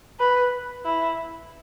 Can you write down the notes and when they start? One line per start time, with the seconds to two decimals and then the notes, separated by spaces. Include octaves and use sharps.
0.19 B4
0.85 E4